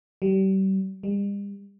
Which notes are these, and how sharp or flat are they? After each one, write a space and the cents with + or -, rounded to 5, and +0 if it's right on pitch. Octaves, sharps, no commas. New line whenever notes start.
G3 -35
G3 +45